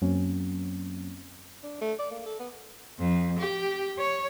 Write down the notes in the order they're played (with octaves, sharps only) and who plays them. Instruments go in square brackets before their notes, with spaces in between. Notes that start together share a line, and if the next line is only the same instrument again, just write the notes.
[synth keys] F#2 F#3 A#3 C4 C#4
[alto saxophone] D4
A3
D5
A#3
A4
B3
[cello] F2
G4
C#5